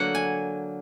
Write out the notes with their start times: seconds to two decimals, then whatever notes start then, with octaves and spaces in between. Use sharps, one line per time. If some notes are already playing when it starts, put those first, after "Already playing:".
Already playing: D3 F#3 A#3 F#5
0.15 G#5